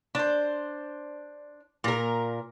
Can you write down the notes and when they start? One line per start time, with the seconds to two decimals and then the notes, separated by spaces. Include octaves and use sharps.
0.15 D4 C5
1.84 A#2 A#4